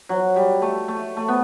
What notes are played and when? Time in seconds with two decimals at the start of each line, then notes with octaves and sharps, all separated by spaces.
0.09 F#3
0.36 G3
0.62 A3
0.88 A3
1.17 A3
1.28 B3